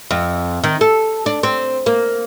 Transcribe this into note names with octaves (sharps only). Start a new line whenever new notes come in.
F2
D#3
A4
D4
C4
A#3